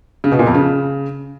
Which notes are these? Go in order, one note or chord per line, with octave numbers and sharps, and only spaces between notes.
C#3
B2
A#2
F2
C#3